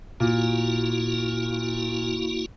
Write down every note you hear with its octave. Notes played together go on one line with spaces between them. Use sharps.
A#2 A#3 E4 F#4